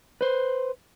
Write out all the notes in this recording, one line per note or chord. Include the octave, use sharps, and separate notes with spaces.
B4 C5